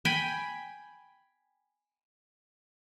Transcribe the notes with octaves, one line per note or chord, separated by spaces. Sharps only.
G5 G#5 B5